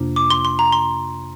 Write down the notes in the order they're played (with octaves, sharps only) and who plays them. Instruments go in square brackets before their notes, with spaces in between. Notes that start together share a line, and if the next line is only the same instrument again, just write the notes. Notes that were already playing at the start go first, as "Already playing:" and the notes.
Already playing: [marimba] F2 C3 A#3 D4 F4
[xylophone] D6
C6
C6
A#5
C6